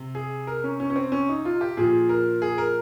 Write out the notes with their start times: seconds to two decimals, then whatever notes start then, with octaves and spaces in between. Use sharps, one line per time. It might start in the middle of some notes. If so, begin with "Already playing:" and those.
Already playing: C3
0.15 G#4
0.47 A#4
0.64 C#4
0.80 C#4
0.90 C#4
0.96 C4
1.12 C#4
1.29 D#4
1.45 F4
1.61 G4
1.77 A#2 F3 G#4
2.09 A#4
2.42 G#4
2.58 A#4